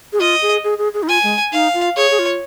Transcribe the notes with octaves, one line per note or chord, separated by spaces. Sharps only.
G#4
F4 D#5
G#4
G#4
G#4
G#4
D#4
F4 G#5
G#3
D#4 F5
F4
G#4 C#5
G#4
F4